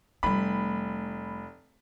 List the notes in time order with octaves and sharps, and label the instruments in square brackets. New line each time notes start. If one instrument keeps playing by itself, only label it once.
[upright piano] F1 B5 [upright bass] G3 A3